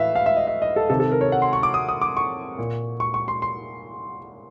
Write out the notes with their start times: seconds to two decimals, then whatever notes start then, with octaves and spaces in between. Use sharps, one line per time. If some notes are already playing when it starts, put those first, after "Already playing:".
Already playing: A2 E3 B4 E5 F5
0.15 F5
0.26 E5
0.37 D#5
0.47 E5
0.62 D#5
0.76 A4
0.90 C3 D#3 A4
1.00 A4
1.11 A#4
1.21 C#5
1.32 F#5
1.42 C6
1.53 C#6
1.63 D6
1.74 D#6
1.89 D#6
2.01 D6
2.17 C#6
2.58 A#2
3.00 C#6
3.14 C#6
3.28 C6
3.42 C6